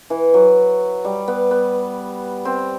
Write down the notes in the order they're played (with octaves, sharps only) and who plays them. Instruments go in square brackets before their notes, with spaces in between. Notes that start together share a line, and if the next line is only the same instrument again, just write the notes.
[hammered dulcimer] E3
F#3
G3
B3
B3
C4